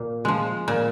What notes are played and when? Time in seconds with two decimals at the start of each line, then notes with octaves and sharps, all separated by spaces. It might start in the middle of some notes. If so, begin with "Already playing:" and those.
Already playing: A#2 A#3
0.25 F3 G#3
0.68 A#2